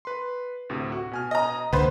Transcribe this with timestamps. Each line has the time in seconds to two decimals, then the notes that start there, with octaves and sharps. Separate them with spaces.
0.05 B4 C6
0.69 D2 A2 C3
0.92 F#4
1.12 B2 G#5 F6
1.31 D#5 A#5
1.73 C#2 D3 A#3 B4 C5